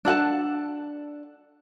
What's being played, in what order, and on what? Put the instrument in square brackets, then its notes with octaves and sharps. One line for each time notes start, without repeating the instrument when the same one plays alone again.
[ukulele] D4 A4 F#5 A5